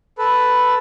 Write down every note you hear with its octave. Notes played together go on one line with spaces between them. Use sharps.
A4 B4